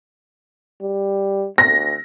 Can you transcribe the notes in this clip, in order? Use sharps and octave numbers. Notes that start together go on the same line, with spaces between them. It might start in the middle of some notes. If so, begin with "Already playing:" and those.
G3
D2 A#6